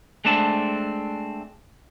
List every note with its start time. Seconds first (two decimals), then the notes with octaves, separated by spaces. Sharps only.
0.25 G#3 A3 C4 D4 A5